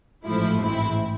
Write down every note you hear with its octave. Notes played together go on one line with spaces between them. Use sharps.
A1 G#2 F3 A3 E4
A1 G#2 G#3 C4 E4